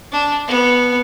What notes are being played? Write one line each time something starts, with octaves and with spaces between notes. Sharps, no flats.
D4
B3